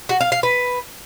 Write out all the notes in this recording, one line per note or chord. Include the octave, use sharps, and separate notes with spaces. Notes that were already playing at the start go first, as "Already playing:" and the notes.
F#4
F5
F5
B4